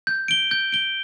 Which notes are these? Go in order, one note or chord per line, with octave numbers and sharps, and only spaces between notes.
G6
D7 G7
G6
D7 G7